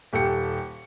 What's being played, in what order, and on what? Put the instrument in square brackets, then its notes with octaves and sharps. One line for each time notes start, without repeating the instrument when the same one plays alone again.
[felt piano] D#1 G4 A4 G5 C#7